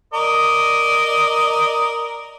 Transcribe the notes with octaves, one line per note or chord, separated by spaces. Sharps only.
A#4 D5 D#5